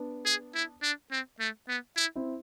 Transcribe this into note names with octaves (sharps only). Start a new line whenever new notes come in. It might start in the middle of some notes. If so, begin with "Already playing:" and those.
Already playing: B3 D4
G#4
E4
D4
C4
A3
B3
E4
C4 E4